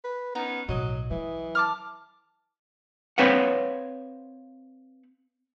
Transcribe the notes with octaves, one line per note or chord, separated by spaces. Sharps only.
B4
B3 C#4 D#4
B1 A2 F#3 D#5
E3 F#3
A5 D6 F6
C4 B4 C#5 F5 F#5